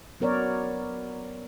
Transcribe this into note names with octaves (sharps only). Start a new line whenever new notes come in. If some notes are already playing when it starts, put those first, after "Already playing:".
F#3 B3 A#4 C#5 D5